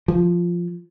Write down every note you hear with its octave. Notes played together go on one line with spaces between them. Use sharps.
F3